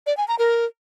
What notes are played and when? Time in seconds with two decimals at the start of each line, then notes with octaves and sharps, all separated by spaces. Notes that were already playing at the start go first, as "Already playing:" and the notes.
0.06 D5
0.17 G#5
0.28 A#5
0.39 A#4